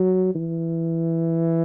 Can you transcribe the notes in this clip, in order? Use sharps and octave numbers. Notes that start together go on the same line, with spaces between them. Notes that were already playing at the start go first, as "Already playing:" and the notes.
Already playing: F#3
E3